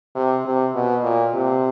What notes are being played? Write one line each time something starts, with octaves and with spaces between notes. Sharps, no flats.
C3
C3
B2
A#2
C3